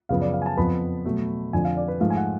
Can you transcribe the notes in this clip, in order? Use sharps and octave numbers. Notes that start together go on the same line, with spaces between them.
F#2 C#3 F3 B3 F5
D5
F5
G#5
A5
F2 F3 B3 B5
B2 F#3 A3
F2 D3 F3 G#5
F5
D5
B4
G#2 F3 A3 F5
G#5
F#5